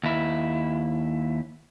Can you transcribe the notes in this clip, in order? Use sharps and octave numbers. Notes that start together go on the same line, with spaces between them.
D#2 E4